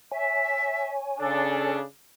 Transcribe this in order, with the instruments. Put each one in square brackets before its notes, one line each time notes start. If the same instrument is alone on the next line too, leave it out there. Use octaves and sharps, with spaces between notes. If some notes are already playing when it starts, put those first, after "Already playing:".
[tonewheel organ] C#5 G#5 [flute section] E5
[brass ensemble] C#3 D4 [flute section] A4